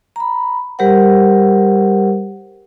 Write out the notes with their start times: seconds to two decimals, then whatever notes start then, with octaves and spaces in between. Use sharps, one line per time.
0.16 A#5 B5
0.79 G3 G4 A#4 C5 F#5